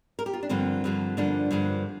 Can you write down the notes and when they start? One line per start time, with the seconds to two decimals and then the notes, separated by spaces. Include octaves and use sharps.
0.19 A#4
0.26 G4
0.33 F4
0.43 D4
0.49 G2 D3 F3 A#3 C4
0.84 G2 D3 F3 A#3
1.17 G2 D3 F3 A#3 D4
1.51 G2 D3 F3 A#3